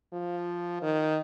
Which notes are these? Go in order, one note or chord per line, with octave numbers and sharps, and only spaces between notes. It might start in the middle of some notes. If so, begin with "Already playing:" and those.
F3
D#3